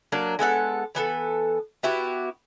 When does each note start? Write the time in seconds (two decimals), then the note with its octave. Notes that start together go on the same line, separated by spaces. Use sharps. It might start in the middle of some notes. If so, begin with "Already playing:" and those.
0.12 F#3 A#3 D4
0.39 G#3 B3 A4 F#5
0.95 E3 B3 A4
1.83 B3 E4 F#4 G4